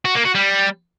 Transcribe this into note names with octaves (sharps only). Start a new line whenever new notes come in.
F#4
A#3
F#4
G3